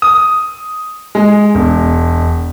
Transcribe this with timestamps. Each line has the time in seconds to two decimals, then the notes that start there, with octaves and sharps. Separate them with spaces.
0.02 D#6
1.15 G#3
1.55 E1